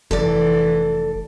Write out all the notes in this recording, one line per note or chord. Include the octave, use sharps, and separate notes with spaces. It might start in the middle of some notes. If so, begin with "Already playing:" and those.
F1 E3 A4 D5